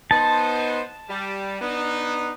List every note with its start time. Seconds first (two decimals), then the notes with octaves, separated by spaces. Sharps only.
0.11 B3 D#4 C5 A5
1.09 G3
1.60 B3 D4 D#4